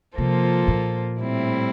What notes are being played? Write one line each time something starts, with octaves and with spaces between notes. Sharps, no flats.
C3 F3 A#3 F4 A4 C5
A#2
A2 G3 C4 E4